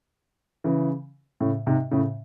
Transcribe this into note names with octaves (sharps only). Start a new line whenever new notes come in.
C#3 E3
A2 C#3
G#2 C3
A2 C#3